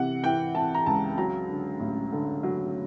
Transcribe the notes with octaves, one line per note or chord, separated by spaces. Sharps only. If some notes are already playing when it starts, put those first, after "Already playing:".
Already playing: C3 E3 F#5
E3 G5
E3 A5
A#5
C#2 A5
F#3 A#5
D3
A1
D3
F#3